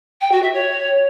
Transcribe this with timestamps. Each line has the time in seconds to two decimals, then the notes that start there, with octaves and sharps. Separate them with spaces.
0.21 G5
0.31 F#4
0.42 E5
0.53 C#5